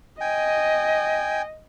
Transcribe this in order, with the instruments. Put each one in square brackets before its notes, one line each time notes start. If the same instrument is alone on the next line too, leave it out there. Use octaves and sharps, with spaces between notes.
[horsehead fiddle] D#5 [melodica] G5 G#5